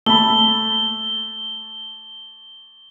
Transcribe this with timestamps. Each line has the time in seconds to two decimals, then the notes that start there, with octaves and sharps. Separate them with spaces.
0.06 A3 B5 G7